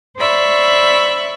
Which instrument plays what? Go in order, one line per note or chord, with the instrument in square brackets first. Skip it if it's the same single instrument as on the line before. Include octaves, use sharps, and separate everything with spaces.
[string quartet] C5 D5 E5 B5 C#6